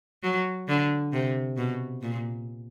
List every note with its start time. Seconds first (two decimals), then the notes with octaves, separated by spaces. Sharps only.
0.23 F#3
0.68 D3
1.13 C3
1.57 B2
2.02 A#2